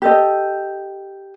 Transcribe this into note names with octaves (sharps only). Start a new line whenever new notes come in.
G4 A4 D#5